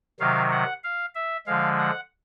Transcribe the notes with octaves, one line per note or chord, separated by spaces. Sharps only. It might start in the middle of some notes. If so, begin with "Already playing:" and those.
C3 D#3 F#3 F5
F#5
F5
E5
D3 F3 G#3 F5
F#5